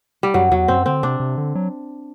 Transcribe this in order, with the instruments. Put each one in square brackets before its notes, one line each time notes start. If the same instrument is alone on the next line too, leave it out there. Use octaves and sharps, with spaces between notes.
[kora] G3
[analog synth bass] F#2 [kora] F#3
[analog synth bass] E2 [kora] F#3
[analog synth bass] F#2 [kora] C4
[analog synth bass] D3 [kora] C4
[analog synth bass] C3 [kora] D4
[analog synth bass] C3
D3
F#3